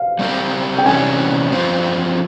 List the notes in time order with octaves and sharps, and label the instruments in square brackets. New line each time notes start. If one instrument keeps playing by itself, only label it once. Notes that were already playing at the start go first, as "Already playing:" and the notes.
Already playing: [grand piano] F5
[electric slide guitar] G3 C4 G4 A#4
[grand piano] G5
[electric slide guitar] C3 E3 G3 C#4 [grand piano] G#5
[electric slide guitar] G2 F3 C4 F4 C5